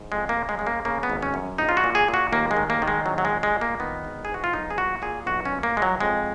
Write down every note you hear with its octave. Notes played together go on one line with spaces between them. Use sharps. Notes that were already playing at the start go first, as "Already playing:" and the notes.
Already playing: G#2
F2 G#3
A#3
C#3
G#3
C#3 G#3
A#3
C#3 A#3
B3
G#1
C#4
F#2
A#1 D#4
F4
F#4
A#2
G#4
A#2
F#4
D#2 A#3
G#3
D#3
A#3
D#3
G#3
A#1 F#3
F#3
G#3
A#2
G#3
A#2
A#3
D#3 B3
G#1
G#2 G#4
F#4
F4
B1 D#4
G#4
A#2 F#4
A#2 G#4
B1 F#4
C#4
A#2
A#3
A#2 G#3
F#3
F2 G#3